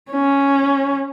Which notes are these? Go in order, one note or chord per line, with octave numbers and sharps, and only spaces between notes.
C#4